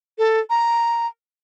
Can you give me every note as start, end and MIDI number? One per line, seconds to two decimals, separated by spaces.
0.18 0.40 69
0.50 1.07 82